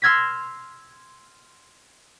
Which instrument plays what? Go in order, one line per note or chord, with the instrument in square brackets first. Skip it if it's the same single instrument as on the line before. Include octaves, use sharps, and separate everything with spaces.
[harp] C6 E6 F6 G#6 A#6 B6